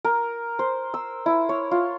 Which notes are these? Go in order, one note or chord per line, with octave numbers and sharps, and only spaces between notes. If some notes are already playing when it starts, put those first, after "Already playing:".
A#4
C5
E6
E4
C#5
F4